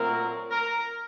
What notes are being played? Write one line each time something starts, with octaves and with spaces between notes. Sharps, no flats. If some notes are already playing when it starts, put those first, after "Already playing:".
Already playing: A#2 F#3 A3 C4 A#4
A#4